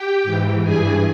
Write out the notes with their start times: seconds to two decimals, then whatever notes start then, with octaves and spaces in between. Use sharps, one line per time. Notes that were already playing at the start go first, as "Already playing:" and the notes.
Already playing: G4 G5
0.24 G#2 E3
0.63 G2 E3 G#4 G#5